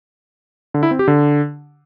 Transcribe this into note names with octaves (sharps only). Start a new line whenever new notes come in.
D3
E4
C4
G4
D3